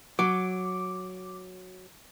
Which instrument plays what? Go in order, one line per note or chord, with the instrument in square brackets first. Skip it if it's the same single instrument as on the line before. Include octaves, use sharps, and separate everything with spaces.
[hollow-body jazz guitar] F#3 [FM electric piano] D6